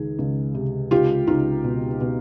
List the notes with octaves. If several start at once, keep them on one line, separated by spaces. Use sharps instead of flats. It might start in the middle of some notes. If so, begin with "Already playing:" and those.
Already playing: C#2 D#3 G#4
C#2
C3
C#2 F4 G4
C#2 D#4 F4
B2
B2